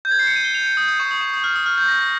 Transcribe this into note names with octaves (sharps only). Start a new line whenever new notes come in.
G6
G#6
C7
C#7
D#7
G7
F7
C#7
D#6
D#6
C#6
D#6
C#6
D#6
F6
D#6
F6
G6
A#6
A#6